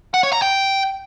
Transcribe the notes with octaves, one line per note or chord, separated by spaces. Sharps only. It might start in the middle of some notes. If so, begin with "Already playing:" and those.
F#5
C#5
A#5
G5